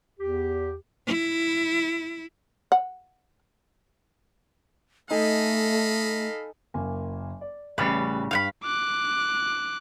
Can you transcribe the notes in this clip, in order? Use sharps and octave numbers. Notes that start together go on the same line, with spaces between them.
E2 G4
E4
F#5
A3 D#4 A4 D#5 F5 G#5 B5
F#1 A#3 G#5
D5
A1 A2 C#3 G3 B4
G2 F5 F#5 B5
D6 F#6